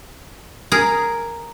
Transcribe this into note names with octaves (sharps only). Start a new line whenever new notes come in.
G#4 A#4